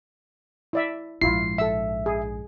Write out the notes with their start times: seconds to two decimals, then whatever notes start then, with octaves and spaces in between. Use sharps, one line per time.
0.73 E4 D5 E5
1.21 A#1 G#2 E4 F4 C7
1.58 A4 E5 E6
2.06 G#4